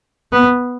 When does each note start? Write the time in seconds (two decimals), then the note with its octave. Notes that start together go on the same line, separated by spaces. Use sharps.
0.32 B3